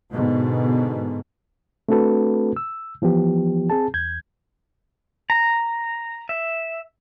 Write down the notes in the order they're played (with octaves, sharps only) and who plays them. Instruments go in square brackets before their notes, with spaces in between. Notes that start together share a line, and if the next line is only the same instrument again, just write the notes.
[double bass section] G#2 B2 D3
[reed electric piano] A3 C4 D4 F#4 A4 B4
E6
E3 F3 B3 G4
C4 G#4 A5
E2 G6 G#6
[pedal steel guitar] A#5
E5